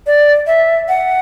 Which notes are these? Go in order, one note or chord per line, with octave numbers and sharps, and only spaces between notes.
D5
E5
F#5